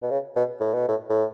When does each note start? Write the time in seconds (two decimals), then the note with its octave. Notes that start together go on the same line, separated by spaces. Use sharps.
0.02 B2
0.11 C#3
0.36 B2
0.60 A2
0.74 B2
0.88 A2
1.10 A2